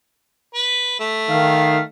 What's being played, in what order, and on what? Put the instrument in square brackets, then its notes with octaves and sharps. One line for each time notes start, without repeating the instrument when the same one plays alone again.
[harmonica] B4
A3
[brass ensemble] D#3 F5